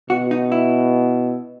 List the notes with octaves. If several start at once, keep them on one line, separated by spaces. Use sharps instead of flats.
B2 F#4
D#4
E4